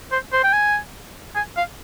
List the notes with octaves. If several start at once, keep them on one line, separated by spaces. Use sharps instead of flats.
C5
C5
G5
G#5
G#5
F5